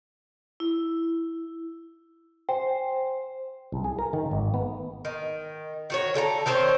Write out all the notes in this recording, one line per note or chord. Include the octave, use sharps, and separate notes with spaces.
E4
C5 G5 G#5
C2
G#4
A#4
D#3
G#1
B3
D#3
D#3 F#4 C#5
D3 A4 G5 A#5
D#3 C4 C5 C#5